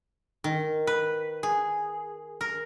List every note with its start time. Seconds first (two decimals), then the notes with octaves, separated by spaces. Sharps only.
0.44 D#3
0.87 B4
1.43 G#4
2.41 A#4